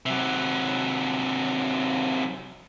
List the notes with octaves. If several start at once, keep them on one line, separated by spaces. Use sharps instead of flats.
C3 F#3